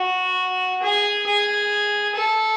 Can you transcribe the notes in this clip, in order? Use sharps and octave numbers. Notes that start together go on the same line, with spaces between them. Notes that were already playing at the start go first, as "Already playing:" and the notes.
Already playing: F#4
G#4
G#4
A4